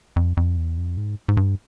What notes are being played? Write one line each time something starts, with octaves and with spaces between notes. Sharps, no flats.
F2
F2
E2
F2
G#2
G#2
G2